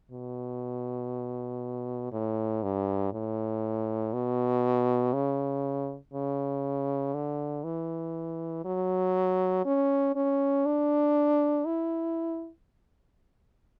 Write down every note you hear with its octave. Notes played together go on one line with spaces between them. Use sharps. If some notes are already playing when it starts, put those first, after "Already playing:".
B2
A2
G2
A2
B2
C#3
C#3
D3
E3
F#3
C#4
C#4
D4
E4